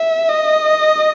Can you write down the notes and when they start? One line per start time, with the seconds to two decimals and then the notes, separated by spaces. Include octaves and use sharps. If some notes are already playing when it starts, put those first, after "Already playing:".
Already playing: E5
0.29 D#5